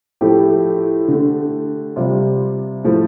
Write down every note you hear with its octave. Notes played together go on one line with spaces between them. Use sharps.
A2 F3 A3 G4
D3 A3
C3 G3 F4
A2 F3 A3 A4